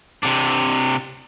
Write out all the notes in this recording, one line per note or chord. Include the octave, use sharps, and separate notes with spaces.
C3 D4